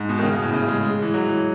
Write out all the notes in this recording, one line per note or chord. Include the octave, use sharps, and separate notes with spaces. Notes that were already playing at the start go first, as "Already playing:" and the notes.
Already playing: G#2
B2
D#3
C#3
B2
A2
C#3
G#3
G#3
E3
F#3
E3